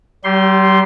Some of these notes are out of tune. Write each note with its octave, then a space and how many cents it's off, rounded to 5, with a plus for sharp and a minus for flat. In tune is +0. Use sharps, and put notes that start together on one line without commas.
G3 -45 G4 +0 C6 +0